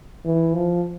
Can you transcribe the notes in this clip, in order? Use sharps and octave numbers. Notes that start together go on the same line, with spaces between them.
E3
F3